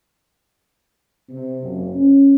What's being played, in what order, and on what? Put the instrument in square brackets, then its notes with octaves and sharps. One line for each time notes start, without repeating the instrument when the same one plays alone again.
[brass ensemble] C3
F#1
C#4